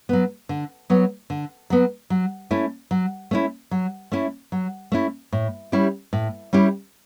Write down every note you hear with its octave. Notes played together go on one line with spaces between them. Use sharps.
F#3 B3
D3
F#3 B3
D3
F#3 B3
F#3
A3 C#4 E4
F#3
A3 C#4 E4
F#3
A3 C#4 E4
F#3
A3 C#4 E4
A2
G3 C#4 E4 G4
A2
G3 C#4 E4 G4